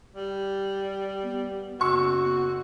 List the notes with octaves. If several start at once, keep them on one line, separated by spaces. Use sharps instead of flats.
G3
B3
F#1 F#4 C#6 E6